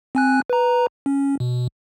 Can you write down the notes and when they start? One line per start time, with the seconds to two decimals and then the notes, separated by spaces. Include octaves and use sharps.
0.15 C4 G#5 F#6
0.50 B4 A#5
1.06 C#4
1.40 B2